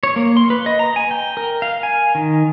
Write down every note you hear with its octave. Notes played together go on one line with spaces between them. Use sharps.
C#5
A#3
C6
B4
D#5
A#5
G#5
G5
A#4
F5
G#5
D#3